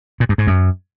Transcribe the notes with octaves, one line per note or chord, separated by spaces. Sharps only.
A#2
G2
G#2
F#2